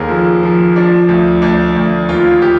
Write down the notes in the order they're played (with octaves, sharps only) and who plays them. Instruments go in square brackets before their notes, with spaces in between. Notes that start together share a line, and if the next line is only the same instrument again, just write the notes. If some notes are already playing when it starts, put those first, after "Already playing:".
Already playing: [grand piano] D#2 D3 G#4 A#4
F3
F3
F3 D4
D2
D2 D4
D2
D#2 F4
G4